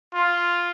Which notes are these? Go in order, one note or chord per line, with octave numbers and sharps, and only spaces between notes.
F4